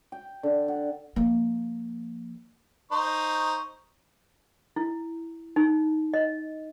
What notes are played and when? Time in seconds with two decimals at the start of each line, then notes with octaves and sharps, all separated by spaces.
0.12 G5
0.43 D3
0.68 F#5
1.16 F3 A#3
2.92 D#4 C5 C#6
4.76 E4
5.56 D#4
6.14 D#5